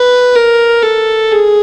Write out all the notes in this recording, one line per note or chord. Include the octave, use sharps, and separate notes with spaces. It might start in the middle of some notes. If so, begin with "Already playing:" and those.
Already playing: B4
A#4
A4
G#4